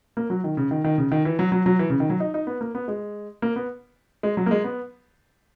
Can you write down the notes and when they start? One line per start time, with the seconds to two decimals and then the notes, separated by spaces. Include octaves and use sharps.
0.17 A#3
0.30 F#3
0.44 D#3
0.57 C#3
0.71 D#3
0.84 D#3
0.98 C#3
1.12 D#3
1.25 E3
1.39 F#3
1.52 F#3
1.66 F#3
1.79 E3
1.90 C#3
2.00 D#3
2.10 F#3
2.20 D#4
2.34 D#4
2.47 B3
2.61 A#3
2.75 B3
2.88 G#3
3.42 A#3
3.56 B3
4.23 G#3
4.37 F#3
4.46 A#3
4.51 G#3
4.64 B3